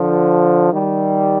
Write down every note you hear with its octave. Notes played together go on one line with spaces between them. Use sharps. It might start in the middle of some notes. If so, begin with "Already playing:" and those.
Already playing: D3 F3
D#3 G3